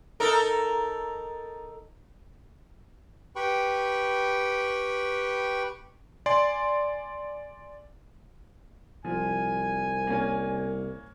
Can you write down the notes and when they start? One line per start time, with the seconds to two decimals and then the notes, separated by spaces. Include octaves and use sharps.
0.20 D#4 A4 A#4
3.36 G4 B4 G5 B5 C#6
6.26 D5 G#5 C6
9.05 C2 F3 G#5
10.07 A#3 C#4